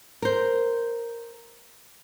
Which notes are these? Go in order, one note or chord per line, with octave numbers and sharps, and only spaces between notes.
A#4 C5